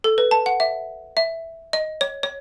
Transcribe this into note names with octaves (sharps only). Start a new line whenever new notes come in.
A4
B4
A5
F#5
E5
E5
D#5
C#5
C#5